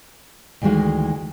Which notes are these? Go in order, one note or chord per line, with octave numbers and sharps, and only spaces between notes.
D2 D#3 E3 G#3 F#4 F5